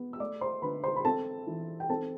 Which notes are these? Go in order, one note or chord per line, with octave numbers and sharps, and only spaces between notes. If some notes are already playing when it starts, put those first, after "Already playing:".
Already playing: B3
E6
A3 D5 D6
C5 C6
D3 B4 B5
C5 C6
B5
C4 A4 A5
E3
G5
C4 A4 A5